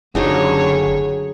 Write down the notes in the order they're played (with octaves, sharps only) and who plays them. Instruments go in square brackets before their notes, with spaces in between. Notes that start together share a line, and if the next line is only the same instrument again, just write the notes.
[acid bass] F#1 [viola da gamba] F#2 D3 C#5 [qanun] F#3 D4 D#4 [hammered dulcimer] G#4